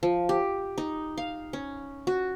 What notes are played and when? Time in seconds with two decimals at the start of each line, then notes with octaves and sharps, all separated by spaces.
0.03 F3
0.29 G4
0.78 D#4
1.18 F5
1.53 C#4
2.07 F#4